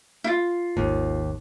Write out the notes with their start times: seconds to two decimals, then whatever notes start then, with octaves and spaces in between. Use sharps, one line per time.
0.24 E4 F4
0.77 G#1 D#2